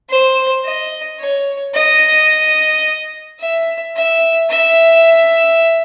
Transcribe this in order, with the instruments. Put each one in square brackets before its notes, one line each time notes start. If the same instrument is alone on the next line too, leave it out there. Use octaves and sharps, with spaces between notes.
[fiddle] C5
D#5
C#5
D#5
E5
E5
E5